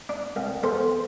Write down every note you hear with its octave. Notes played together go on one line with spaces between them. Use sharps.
D4
C2
E2 A4 C5